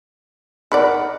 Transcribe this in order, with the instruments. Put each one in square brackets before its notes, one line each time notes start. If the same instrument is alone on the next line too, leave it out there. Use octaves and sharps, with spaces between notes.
[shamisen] D#4 B4 D5 [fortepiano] A#4 F#5 B5